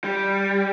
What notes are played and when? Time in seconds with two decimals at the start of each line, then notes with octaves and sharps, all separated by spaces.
0.04 G3